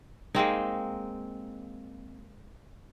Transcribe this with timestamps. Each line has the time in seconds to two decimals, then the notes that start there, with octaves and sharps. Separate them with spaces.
0.35 G#3 A#3 C4 D#4